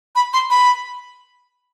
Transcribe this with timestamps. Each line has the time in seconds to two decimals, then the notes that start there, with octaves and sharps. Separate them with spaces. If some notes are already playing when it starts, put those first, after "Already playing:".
0.16 B5
0.33 C6
0.50 B5